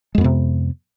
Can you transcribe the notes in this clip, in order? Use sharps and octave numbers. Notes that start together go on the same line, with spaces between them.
F2 C3 G#3 B3